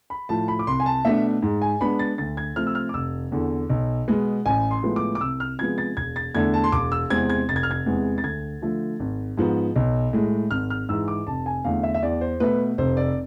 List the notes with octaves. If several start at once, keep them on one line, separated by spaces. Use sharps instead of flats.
B5
A2 F3 A5
B5
D6
C2 C6
G#5
A5
B2 A3 D4 E5
G#2
G#5
G#3 B3 D4 B5
A6
D2 A6
G#6
C3 F3 A3 C4 F6
E6
F6
D6
F1 E6
E2 D3
B1
B2 G#3 B3
A1 G#5
C6
A2 F3 G#3 B3
D6
D6
C2 E6
F6
C3 F3 G#3 B3 G#6
A6
E1 G#6
A6
E2 D3 A3 D4 G#6
A5
C6
E1 D6
E6
E2 C3 G#3 C4 G#6
G#6
F1 A6
G#6
F6
G#6
E2 C3 G#3 B3
A6
D2 G#6
D3 F3 A3
G#1
G#2 F3 B3
B1
A2 G#3
G#1 F6
F6
G#2 E3 E6
D6
F1 A5
G#5
E2 D3 A3 F5
E5
E5
E2 D5
C5
B2 A3 B4
F1 C5
D5